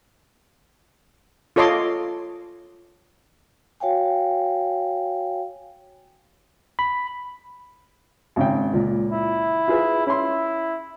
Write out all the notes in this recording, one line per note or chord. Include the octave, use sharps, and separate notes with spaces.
F4 A4 C#5 D#5 C6 D6
F#4 C#5 F5 G5 G#5
B5
G#1 C#3 G5
C#2 A#2
E4
F4 G#4 B4
C#4 E4 C6